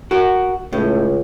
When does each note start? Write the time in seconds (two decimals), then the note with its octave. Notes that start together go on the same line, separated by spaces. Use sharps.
0.11 F#4 A#4
0.73 C#2 A2